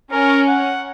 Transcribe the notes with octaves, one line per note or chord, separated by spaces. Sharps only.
C#4 A#4
F#5